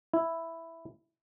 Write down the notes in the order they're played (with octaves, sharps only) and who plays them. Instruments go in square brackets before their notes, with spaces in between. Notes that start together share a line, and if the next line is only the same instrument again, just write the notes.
[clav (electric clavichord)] E4